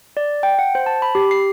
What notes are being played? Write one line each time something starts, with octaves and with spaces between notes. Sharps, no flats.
D5
G5
F#5
C5
A5
B5
G4
C7